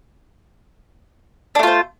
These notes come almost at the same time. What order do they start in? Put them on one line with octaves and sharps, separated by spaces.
D4 A3 F4 C5